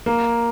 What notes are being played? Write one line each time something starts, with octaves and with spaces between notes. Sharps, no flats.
A#3